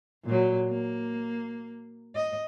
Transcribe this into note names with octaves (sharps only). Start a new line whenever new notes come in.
A#2 F#3
A#3
D#5